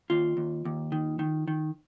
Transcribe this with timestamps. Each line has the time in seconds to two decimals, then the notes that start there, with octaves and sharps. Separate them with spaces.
0.10 D#2 F4
0.37 D#2
0.65 D#2
0.92 D#3
1.19 D#3
1.48 D#3